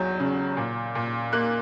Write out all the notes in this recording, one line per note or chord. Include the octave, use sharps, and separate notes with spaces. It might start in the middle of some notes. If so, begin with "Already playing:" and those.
Already playing: E2 F#3 G6
C#3
A#2
A#2
A#3 F#6